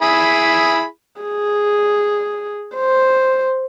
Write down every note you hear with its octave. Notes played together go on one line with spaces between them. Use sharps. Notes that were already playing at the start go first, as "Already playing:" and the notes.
E4 G#4 B5
G#4
C5